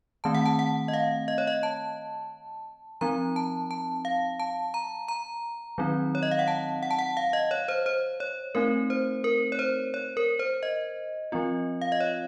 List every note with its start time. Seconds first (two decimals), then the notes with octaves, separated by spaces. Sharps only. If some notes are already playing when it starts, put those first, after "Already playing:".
0.24 D#3 A3 C4 A5
0.35 F#5
0.46 A5
0.59 F#5
0.88 D#5
0.93 F5
1.28 D#5
1.38 C#5
1.47 D#5
1.63 A5
3.01 F3 C4 D#4 A#5
3.36 A5
3.71 A5
4.05 F5
4.40 A5
4.74 A#5
5.08 A#5
5.78 D#3 F#3 C4 D#4
6.15 C#5
6.23 D#5
6.31 F5
6.39 F#5
6.48 A5
6.83 F#5
6.91 A5
6.99 F#5
7.17 F5
7.33 D#5
7.51 C#5
7.68 C5
7.86 C5
8.20 C#5
8.55 A3 C4 D#4 A#4
8.90 C5
9.24 A#4
9.52 C#5
9.59 C5
9.94 C#5
10.17 A#4
10.39 C5
10.63 D#5
11.32 F3 C4 F4
11.81 F5
11.92 D#5
12.00 C#5